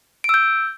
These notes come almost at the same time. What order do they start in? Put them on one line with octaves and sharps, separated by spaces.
D7 E6 G6